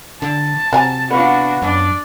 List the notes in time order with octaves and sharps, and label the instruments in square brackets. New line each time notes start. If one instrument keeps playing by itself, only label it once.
[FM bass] D3 [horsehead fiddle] A5
[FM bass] C3 [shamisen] F#3 G#5 A#5
[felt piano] B3 F5 [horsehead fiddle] D4 F#4
[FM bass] F#2 [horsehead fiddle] D4 D5